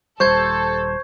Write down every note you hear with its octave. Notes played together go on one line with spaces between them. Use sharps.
D#1 G3 A4 C5 C#6 G6 G#6